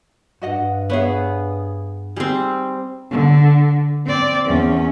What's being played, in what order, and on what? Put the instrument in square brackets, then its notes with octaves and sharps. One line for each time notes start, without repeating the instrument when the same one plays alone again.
[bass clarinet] G2 [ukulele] F#4 D#5 F#5
[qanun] B3 G#4 [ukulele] B4 C#5 E5
[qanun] G3 C4 [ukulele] D#4 G#4
[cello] D3
C4 D5
E2 C#4